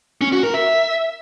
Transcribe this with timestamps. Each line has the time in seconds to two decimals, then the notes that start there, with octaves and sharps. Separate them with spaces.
0.21 C#4
0.32 F#4
0.43 A#4
0.54 E5